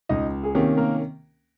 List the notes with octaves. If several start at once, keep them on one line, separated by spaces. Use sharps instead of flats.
C#2 D#4 D#5
G#4
C3 D#3 A#3 C#4 G4
A#3 A#4